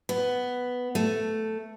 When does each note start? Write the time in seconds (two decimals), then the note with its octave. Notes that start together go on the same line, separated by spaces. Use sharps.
0.09 B3
0.95 A3